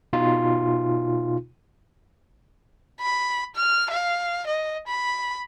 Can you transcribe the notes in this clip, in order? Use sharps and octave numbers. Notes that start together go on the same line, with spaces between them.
B2 D#4 F4
B5
F6
F5
D#5
B5